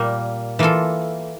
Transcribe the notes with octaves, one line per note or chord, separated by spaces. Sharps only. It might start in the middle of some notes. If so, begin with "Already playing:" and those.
Already playing: A#2 G3 A#3
E3 A#3 F4 A4